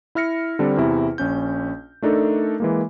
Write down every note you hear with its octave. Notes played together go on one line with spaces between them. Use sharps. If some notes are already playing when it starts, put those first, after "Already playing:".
E4 E5 F6 A#6 C#7
D3 G3 C4 D4
E2 C3 E4
A#1 C#4 G6
A3 D4 D#4 A4 A#4
E3 G#3 A#3